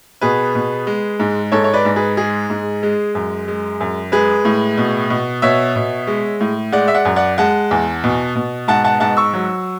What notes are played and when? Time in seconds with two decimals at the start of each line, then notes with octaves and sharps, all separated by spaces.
0.21 B2 G#4 B4
0.55 B2
0.87 G#3
1.19 G#2
1.52 G#2 A4 C#5
1.64 C#5
1.74 B4 D5
1.85 G#2
1.96 G#4 B4
2.17 G#3 G#4
2.50 G#2
2.83 G#3
3.15 F#2
3.48 G#3
3.80 F#2
4.12 G#3 G#4 B4
4.45 A2
4.78 B2
5.10 B2
5.42 B2 C#5 E5
5.76 B2
6.07 G#3
6.40 A2
6.72 G#3 D5 F#5
6.88 E5
6.95 D5 F#5
7.05 F#2
7.16 D5 F#5
7.38 G#3 F#5 A5
7.71 E2
8.04 B2
8.36 B2
8.68 G#2 F#5 A5
8.85 F#5 A5
9.00 G#2 F#5 A5
9.17 C#6 E6
9.33 F#3